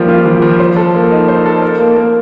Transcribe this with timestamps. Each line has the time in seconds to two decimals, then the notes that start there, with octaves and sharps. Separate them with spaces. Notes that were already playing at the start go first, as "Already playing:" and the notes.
Already playing: F3 G3 A#3
0.08 F4
0.26 F3
0.42 F3
0.60 C5
0.76 A4
0.94 A#3
1.11 D#4
1.28 C5
1.46 A4
1.62 A#4
1.79 A#3
1.96 A#3